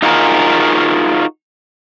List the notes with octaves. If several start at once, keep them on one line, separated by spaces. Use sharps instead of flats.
D#4 F4 F#4 G#4 A#4